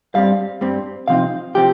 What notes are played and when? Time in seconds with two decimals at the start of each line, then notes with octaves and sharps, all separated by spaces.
0.14 G2 G3 C4 F5
0.61 G2 G3 C4
1.08 C3 F3 C4 D#4 F5
1.54 C3 F3 C4 G4